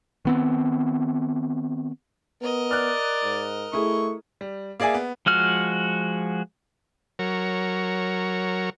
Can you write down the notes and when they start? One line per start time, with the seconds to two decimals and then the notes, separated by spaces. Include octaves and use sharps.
0.25 D#3 B3 C4
2.42 B3 A#4 D#5
2.71 D5 F6 F#6
3.24 G#2
3.73 A3 E4 G#4 C#6
4.41 G3
4.80 A#3 G#4 D5 E5 G#5
4.94 B3
5.26 F3 G#3 F#4 F6
7.19 F#3 A#4 C#5